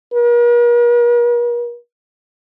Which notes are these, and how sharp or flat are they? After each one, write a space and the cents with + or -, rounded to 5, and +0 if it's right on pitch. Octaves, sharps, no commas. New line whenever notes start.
A#4 +45